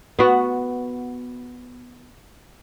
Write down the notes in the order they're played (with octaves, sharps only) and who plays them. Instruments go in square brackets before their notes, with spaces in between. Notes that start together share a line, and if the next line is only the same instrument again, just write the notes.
[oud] B3 F#4